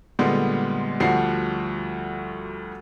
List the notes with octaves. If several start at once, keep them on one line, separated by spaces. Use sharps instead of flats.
A#2 D3 G3 G#3 B3
D2 F3 G3 F#4 F#5 C7